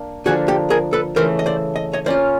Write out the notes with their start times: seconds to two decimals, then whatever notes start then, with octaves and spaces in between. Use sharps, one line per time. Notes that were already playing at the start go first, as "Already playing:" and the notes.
Already playing: A#3 D4
0.25 D3 F3 A#3 D4 F#4 G#4
0.48 G4 A4
0.70 G#4 A#4
0.93 A4 B4
1.16 C#3 E3 A3 A#4 C5
1.39 D#5
1.46 C5 D5
1.76 D#5
1.93 C#5 D#5
2.06 A#3 C#4 F4 C5 D5